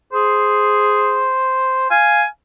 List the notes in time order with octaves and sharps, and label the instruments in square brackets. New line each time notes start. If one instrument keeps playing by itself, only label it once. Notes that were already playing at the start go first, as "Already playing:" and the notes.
[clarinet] G#4 [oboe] C5
[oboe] F5 [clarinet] G#5